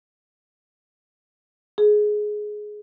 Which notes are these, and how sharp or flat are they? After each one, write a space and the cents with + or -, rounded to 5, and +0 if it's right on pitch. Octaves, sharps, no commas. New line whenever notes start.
G#4 +15